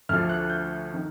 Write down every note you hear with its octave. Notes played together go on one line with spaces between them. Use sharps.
D2 D3 F3 F6
F#6
G6
D#3